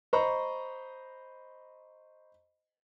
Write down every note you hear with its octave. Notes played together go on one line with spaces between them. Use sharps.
C5 D#5 A#5 B5 C#6